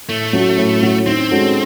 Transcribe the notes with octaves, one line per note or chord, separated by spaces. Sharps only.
A2 A3
F#3 C#4 F#4
A2
F#3 C#4 F#4
D#3 C4
G#3 C#4 F#4 A4